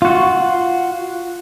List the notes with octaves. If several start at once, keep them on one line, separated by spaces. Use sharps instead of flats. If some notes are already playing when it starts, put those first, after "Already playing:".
F4 F#4